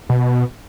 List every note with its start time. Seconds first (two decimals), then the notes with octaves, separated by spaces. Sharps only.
0.09 B2